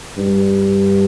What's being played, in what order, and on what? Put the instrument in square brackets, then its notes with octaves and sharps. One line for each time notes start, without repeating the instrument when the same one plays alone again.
[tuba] G2